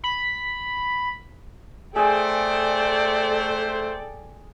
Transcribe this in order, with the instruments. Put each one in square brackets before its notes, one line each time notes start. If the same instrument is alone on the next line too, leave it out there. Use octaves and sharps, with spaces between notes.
[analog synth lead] B5
[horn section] A3 C5 [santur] G#4 G#5 [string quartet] A4 D5 G5